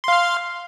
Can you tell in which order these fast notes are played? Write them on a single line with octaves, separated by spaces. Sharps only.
C6 F5 F6